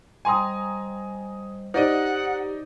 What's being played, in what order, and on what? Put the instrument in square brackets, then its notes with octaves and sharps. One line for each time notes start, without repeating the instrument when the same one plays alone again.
[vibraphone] G3 C5 D#5 [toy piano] G5 C6 [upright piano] G#5 A#5 D#6
[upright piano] D#4 D5 D#5 [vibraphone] G4 [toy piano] C5 [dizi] F#5